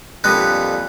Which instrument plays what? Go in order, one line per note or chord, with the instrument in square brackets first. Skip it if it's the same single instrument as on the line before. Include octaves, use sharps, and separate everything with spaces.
[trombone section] F2 A#2 [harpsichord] D3 G3 B3 [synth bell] F#6